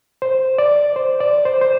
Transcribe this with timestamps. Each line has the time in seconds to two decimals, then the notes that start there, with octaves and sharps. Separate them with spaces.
0.22 C5
0.58 D5
0.96 C5
1.20 D5
1.45 C5
1.61 C5